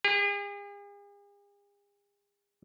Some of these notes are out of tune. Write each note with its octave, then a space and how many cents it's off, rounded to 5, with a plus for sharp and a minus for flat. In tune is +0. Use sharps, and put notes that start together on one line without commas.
G#4 -45